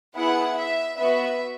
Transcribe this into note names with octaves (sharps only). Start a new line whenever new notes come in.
B3 E4 G#4 F#5
E5
B3 F#4 E5